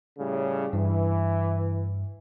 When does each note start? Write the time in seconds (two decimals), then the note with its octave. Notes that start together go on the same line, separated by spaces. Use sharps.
0.19 A2 C#3 G3
0.73 G2 E3